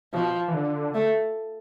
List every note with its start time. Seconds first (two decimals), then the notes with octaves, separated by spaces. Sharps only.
0.14 B2 F3
0.48 E3
0.54 D3
0.95 A3